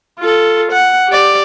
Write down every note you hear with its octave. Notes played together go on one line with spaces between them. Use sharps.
F4 A4
F#5
G4 D5